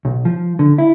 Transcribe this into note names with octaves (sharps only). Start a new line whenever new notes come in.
B1
F3
D3
E4